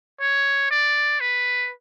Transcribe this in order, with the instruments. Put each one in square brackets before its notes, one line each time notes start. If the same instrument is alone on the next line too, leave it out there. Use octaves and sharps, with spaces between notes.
[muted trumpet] C#5
D5
B4